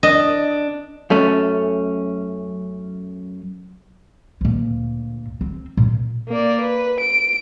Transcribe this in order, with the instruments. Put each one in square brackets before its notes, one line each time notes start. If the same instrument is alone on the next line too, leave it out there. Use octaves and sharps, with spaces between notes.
[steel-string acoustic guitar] D4 [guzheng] D#5
[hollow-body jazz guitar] F#2 A3 C#4
[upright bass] D2 A#2
C4
A#2
[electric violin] A#3 D5
B4
D7